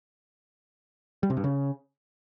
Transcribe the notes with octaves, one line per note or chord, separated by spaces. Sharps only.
G3
C3
G2
C#3